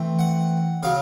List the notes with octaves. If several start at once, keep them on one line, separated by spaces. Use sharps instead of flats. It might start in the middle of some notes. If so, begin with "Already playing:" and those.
Already playing: E3 A3 C4
F#5
C#3 F#3 F5